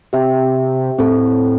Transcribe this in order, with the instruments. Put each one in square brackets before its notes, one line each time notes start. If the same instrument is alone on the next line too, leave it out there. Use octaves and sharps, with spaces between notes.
[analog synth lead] C3 [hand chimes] G4 E5 G5
[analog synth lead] A2 [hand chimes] C4 A4